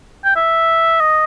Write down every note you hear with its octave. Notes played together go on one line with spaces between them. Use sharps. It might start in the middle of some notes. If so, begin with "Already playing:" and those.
G5
E5
D#5